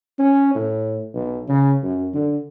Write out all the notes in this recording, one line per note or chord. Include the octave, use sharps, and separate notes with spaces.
C#4
A2
B1
C#3
F#2
D3